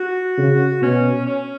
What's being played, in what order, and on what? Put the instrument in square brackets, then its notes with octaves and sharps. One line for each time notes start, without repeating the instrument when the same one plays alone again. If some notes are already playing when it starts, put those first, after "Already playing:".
Already playing: [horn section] F#4
[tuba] C#3
[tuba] B2 [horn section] C#4
[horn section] C#4